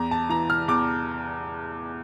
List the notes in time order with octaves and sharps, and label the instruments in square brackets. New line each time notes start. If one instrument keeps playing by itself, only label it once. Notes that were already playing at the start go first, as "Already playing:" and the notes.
Already playing: [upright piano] E2 A#5
A5
E3 A#5
F6
E2 D6